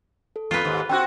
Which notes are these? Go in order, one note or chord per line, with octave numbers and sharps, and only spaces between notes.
A4
E2 F4 B4
D#2 G#2
C4 C#4 F#4 G5 F#6